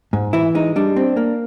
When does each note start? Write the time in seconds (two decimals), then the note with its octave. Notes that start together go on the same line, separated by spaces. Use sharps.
0.13 G#2
0.33 E3 E4
0.55 G#3 D#4
0.76 G3 D4
0.96 C4
1.17 A#3